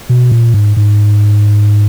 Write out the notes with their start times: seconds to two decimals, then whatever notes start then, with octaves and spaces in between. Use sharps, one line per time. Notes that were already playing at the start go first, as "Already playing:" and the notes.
0.09 B2
0.31 A#2
0.54 G#2
0.77 G#2